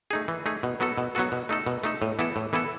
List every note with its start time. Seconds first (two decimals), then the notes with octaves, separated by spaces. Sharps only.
0.11 A3 D#4 G#4
0.28 E3
0.46 A3 D#4 G#4
0.63 B2
0.80 F#3 B3 F#4 A4
0.98 B2
1.15 F#3 B3 F#4 A4
1.32 B2
1.49 A3 D#4 A4
1.66 B2
1.84 A3 D#4 A4
2.02 A2
2.19 E3 B3 E4 A4
2.36 A2
2.53 E3 B3 E4 A4